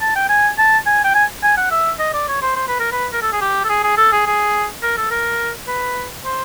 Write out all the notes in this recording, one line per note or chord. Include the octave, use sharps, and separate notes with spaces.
A5
G5
G#5
A5
G#5
G5
G#5
G#5
F#5
E5
D#5
D5
C#5
C5
C5
B4
A#4
B4
A#4
A4
G#4
G4
A4
G#4
G#4
A4
G#4
G#4
A#4
A4
A#4
B4
C5